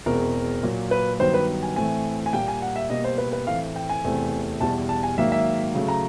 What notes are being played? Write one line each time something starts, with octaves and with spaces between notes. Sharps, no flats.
E2 B2 G#3 C4 A#4
A#2 F#3 A#3
B4
G2 D#3 F#3 B3 C5
B4
G#5
A2 E3 A3 C4 G#5
G#5
A#2 G3 A#3 G5
G#5
F#5
E5
B2 G3 A#3 D#5
C5
B4
B4
A2 E3 A3 C4 F5
G5
G#5
E2 C3 E3 A3 C4
E2 B2 G3 A5
A5
G#5
G#2 D#3 F#3 A#3 E5
E5
C#3 F#3 A3
A#5